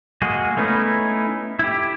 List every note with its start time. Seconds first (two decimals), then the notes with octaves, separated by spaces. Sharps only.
0.22 G#3 A#3 F#4 G#4
0.57 A3 B3 C#4 D#4 E4
1.59 E4 G4